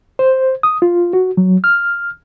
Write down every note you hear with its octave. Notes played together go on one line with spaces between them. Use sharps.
C5
D#6
F4
F#4
F#3
F6